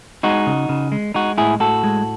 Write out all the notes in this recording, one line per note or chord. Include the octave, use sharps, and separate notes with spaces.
G#3 D#4 F#4
C#3
C#3
G#3
G#3 D#4 F#4
A2 E4 G#4
A2 F#4 A4
G#3